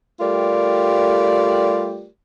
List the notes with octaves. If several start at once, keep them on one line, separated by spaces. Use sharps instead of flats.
G3 A3 F4 G4 A#4 D5